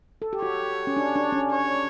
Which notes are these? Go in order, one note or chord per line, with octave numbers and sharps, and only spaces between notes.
A4
G4
F#4 C#5
C#4
D4
D4
C#4
C#5